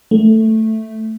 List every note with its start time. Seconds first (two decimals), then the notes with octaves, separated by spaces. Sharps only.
0.11 A3